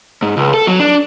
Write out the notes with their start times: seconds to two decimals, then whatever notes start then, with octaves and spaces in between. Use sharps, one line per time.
0.22 G#2
0.37 C#2
0.54 A4
0.67 F#3
0.80 D4